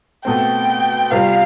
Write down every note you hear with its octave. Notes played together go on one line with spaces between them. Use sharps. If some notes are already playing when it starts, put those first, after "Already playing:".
B2 A3 C4 G5
C3 G3 C4 F4 F5